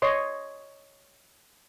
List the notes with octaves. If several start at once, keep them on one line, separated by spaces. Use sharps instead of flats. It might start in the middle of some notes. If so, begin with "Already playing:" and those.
C#5 D#5 C6